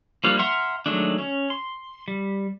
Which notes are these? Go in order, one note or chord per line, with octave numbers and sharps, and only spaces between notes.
F3 G3 A#3 D4 F4
E5 F#5 A#5 C6 F6
D#3 F#3 G#3 A3 D4
C#4
C6
G3